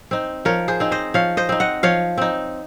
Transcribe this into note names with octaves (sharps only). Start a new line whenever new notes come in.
C4 D#4
F3 A#4 C#5
G#4 C5
C4 D#4
C5 D#5
F3 C#5 F5
C5 D#5
C4 D#4
D#5 F#5
F3 C#5 F5
C4 D#4